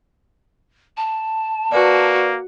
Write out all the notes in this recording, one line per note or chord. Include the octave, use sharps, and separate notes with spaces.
A5
A#3 F#4 B4 D5